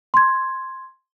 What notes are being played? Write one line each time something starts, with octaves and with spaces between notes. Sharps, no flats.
C6 G#6